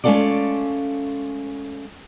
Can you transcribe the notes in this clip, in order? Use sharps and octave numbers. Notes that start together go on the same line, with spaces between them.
G#3 A3 C#4 F4 A4 D5